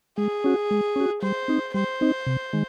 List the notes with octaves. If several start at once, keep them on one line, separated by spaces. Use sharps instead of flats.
G#3 G#4
C#4 F#4
G#3
C#4 F#4
G3 C5
C4 D#4
G3 C5
C4 D#4
C3
D#3 G#3